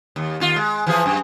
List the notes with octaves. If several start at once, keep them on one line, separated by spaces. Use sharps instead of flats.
D#2
D#2 F4
G#3
E3 F3 G#4
F#2